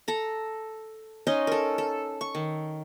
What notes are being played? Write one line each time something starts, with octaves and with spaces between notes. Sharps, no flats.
A4 A#5
C#4 D#4 D#5 C6
A4 A#4
A4
C#6
D#3